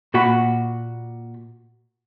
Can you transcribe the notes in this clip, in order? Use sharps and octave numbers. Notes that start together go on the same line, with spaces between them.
A#2 F#4 B5